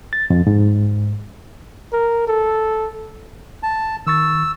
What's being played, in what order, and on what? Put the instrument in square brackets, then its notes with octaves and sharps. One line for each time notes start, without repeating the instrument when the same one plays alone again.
[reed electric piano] A6
F2
G#2
[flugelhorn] A#4
A4
[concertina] A5
[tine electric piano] D#3 C#6 A6 [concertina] E6